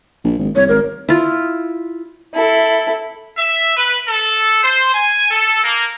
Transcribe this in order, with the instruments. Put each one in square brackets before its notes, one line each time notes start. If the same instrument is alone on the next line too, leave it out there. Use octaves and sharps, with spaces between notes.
[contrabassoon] A#1
G#1
[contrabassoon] C2 [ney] C#5
[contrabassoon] G#1 [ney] A#4
[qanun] E4 F4
[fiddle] E4 A4
[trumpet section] E5
B4
A4
C5
G#5
A4
A#3